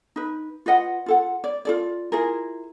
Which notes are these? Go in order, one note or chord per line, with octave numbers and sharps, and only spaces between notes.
D#4 B4
F4 B4 D#5 F#5
F4 A4 F#5
D5
F4 A4 D5
E4 F4 G#4 A#4